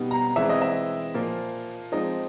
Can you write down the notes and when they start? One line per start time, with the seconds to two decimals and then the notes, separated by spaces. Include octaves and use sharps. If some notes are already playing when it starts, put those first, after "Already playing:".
Already playing: B2 G3 B3 D#4
0.11 A#5
0.36 E3 G#3 C4 E5
0.49 D#5
0.62 E5
1.14 A#2 F3 A#3
1.92 F3 G#3 C4 D#4 D#5